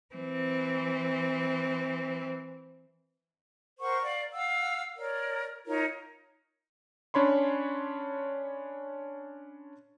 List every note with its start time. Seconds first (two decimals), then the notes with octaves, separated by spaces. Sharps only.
0.15 E3 C4
3.80 A#4 C5 F#5 C#6
4.03 D5 F5
4.33 F5 F#5 E6
4.96 A#4 C#5 D5
5.66 D#4 F4 A#4 C#5
7.14 C#4 D4 C#5 B5 C6